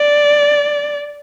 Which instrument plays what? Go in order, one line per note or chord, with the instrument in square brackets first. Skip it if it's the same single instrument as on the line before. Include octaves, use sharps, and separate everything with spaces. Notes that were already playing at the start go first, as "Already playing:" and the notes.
Already playing: [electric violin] D5